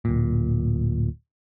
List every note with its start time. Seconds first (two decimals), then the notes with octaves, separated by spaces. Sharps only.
0.05 D1 A#2